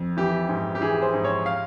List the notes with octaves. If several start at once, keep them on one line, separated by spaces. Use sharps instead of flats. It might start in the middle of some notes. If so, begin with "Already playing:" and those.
Already playing: F2
E3 G4
G#2
G4
E3 G#4
C5
G#2
C#5
F5